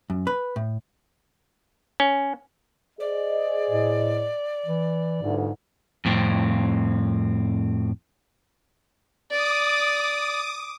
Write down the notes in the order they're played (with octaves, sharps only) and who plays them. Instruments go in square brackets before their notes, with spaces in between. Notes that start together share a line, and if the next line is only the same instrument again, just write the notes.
[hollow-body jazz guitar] F#2
B4
A2
[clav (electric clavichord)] C#4
[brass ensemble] G#4 C5 D#5 [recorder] D5
[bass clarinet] A2
E3
[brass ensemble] G1 D2 [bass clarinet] G#2
[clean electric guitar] F2 A2 C4
[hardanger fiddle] D5 [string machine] D6 D#6